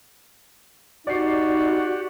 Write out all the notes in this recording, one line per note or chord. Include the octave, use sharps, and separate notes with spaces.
D#4 F#4 G4 D5 F#5 C7